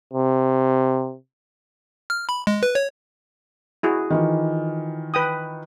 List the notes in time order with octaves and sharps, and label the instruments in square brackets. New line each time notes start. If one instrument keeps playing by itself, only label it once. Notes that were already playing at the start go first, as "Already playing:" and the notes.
[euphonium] C3
[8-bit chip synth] F6
B5
G#3
B4
C#5
[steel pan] E4 F#4 G#4
[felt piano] D#3 E3 F4
[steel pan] B4 G5 D#6